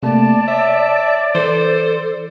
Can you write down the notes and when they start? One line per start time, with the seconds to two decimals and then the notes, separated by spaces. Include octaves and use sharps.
0.03 C3 A3 A#3 D5 A5
0.48 C#5 E5
1.35 E3 A4 C5